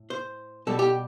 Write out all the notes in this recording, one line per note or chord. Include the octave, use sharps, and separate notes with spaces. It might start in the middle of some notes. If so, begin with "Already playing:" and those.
Already playing: A2
C5
B2 G3 A4
G4